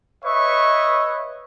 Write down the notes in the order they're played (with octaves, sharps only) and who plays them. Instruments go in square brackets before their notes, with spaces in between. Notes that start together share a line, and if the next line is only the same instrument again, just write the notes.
[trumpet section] B4 C#5 D#5 E5 C#6